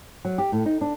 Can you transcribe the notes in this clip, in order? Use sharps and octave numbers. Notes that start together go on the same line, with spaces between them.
F#3
G4
A2
D#4
D4